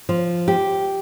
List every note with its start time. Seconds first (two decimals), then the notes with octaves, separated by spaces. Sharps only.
0.09 F3
0.48 G4